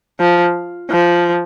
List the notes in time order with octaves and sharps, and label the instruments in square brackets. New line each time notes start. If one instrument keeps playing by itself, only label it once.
[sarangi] F3
F3